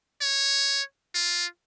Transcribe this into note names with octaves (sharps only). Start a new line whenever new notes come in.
C#5
F4